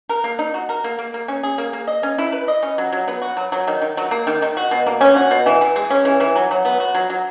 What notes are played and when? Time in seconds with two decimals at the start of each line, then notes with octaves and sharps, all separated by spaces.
0.09 A#4
0.24 A#3
0.39 D#4
0.54 F#4
0.69 A#4
0.84 A#3
0.99 A#3
1.14 A#3
1.28 C#4
1.43 G#4
1.58 A#3
1.73 A#3
1.87 D#5
2.03 C#4
2.18 E4
2.32 B4
2.48 D#5
2.63 C#4
2.78 F#3
2.93 F#3
3.08 B3
3.22 F#4
3.37 F#3
3.52 F#3
3.68 D#3
3.82 D#3
3.97 F#3
4.11 A#3
4.27 D#3
4.42 D#3
4.57 F#4
4.71 B2
4.86 A#3
5.01 C#4
5.16 F#4
5.31 B2
5.46 E3
5.61 E3
5.76 G#3
5.90 C#4
6.05 E3
6.20 E3
6.36 F#3
6.51 F#3
6.65 B3
6.80 F#4
6.95 F#3
7.10 F#3